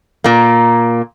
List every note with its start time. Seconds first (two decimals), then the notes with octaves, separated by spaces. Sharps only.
0.24 A#2 A#3